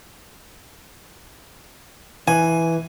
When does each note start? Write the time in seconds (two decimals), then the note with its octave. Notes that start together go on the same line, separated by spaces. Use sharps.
2.28 E3 G#5